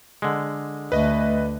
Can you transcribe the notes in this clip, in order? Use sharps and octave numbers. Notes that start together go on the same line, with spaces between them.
D3 G#3
D2 A3 B4 D#5